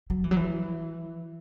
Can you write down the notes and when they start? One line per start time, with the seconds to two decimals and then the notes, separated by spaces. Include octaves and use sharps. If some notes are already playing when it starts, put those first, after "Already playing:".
0.10 F#3
0.24 E3
0.31 F#3
0.36 E3